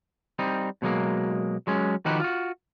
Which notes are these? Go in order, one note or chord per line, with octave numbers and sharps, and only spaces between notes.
G3 C4 D#4
B2 F#3 G#3 A#3
F#3 G#3 C#4
D#3 F3 D#4 F#4 G4 B4
F4 F#4